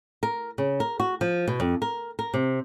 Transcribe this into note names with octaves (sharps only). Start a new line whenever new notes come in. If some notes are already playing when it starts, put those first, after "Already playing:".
A#4
C#3
A#4
F#4
F3
B2
F2
A#4
A#4
C3